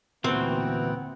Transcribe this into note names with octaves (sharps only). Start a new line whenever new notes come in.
D2 A#2 E3 B3 C4 F#4 F#5 G5